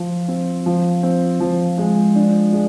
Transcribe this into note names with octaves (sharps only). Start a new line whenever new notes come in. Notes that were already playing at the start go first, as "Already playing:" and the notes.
Already playing: F3 F4
C4
F3
C4
F3
G#3
D4
G#3